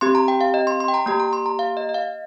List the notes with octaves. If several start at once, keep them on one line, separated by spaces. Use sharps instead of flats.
C4 G4 C6
A#5
G5
F5
D#5
C6
C6
G5
A#5
A#3 G4 A#5
A#5
C6
A#5
F5
D#5
D#5
F5